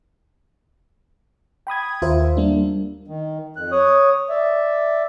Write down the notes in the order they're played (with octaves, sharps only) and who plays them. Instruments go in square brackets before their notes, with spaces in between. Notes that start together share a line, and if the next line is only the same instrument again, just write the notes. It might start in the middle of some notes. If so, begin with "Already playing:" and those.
[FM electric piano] G5 B5 D#6 G#6
D#2 F4 A#4 C5 E5
G3 A#3 D4
[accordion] D#3
F2 F#6
C#5 D#6
D5 E5